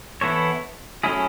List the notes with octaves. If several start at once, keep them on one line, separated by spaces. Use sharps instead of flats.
E3 B3 E4 A4 C#5
F#3 A3 C#4 E4 G#4